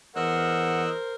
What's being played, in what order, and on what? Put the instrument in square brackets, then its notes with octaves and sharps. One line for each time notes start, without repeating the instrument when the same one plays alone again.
[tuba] E2 [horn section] A#4 C5 [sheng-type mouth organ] D#5 E6 F#6 [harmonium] F#5